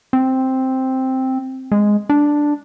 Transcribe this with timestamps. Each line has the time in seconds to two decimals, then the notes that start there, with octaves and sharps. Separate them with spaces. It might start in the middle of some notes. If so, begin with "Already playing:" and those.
0.13 C4
1.72 G#3
2.09 D4